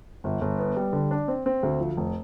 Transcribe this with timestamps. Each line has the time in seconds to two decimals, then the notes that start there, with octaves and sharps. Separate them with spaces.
0.24 G1
0.41 G1
0.59 B3
0.76 G3
0.93 D3
1.11 D4
1.28 C4
1.46 C4
1.63 D2
1.80 F3
1.97 F1